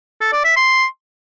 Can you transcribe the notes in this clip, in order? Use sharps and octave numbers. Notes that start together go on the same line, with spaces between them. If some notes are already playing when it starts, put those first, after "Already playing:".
A4
D5
E5
C6